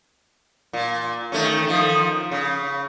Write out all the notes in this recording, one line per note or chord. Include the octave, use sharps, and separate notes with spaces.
A#2
D#3 A3 C#4
D#3 F3
C#3